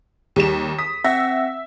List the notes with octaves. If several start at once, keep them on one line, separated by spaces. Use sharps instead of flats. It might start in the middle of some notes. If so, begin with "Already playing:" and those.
D#2 G3 E7
D#6 B6
C4 E5 F#5 A#6